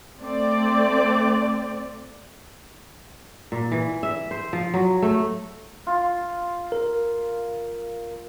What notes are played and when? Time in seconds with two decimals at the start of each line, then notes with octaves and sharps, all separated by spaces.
0.19 A3 C4 D5
3.52 A#2
3.72 E3
4.03 E5
4.31 C5
4.53 F3
4.74 F#3
5.02 A3
5.87 F4
6.72 A#4